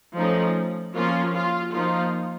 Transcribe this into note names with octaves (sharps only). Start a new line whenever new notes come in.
F3 A3 C#4 D#4
F3 A#3 C#4 F4
F4
F3 A#3 D#4 F4